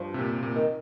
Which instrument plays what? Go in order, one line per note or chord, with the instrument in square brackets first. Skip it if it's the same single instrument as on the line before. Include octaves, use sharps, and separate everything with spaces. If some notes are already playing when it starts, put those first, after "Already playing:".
Already playing: [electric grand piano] G2 [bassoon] F3
[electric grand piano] C3
A#2
C3
A#2
[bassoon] D#3